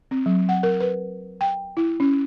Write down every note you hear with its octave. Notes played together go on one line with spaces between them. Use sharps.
C4
F#3
F#5
A#4
B4
G5
E4
C#4